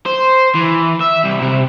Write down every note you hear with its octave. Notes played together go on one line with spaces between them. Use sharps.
C5
E3
E5
C2
C3